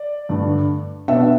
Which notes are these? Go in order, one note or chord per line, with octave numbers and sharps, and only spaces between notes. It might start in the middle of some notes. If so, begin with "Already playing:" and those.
Already playing: D5
G2 D3 A3 D4
B2 B3 D4 E5